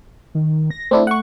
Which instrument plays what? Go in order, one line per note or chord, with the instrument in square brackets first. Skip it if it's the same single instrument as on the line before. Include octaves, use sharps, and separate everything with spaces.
[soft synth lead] D#3
A#6
[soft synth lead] A3 [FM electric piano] C4 D4 E4
[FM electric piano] F#5 C#6